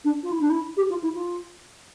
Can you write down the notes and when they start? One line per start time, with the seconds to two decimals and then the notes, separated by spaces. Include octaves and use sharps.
0.04 D4
0.23 F4
0.31 E4
0.40 D4
0.49 E4
0.76 G4
0.89 F4
1.02 E4
1.14 F4